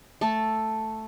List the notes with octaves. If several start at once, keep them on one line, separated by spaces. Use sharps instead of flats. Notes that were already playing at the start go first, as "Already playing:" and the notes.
A3 A4